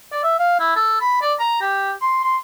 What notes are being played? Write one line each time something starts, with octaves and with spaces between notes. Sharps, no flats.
D5
E5
F5
E4
A4
B5
D5
A#5
G4
C6
C6